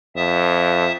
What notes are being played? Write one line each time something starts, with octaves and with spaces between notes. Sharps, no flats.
F2 E5 A5 D#6